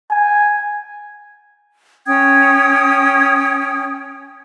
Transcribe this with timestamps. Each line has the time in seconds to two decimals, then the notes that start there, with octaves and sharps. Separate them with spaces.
0.10 G#5
2.06 C#4 G5 D#6 G#6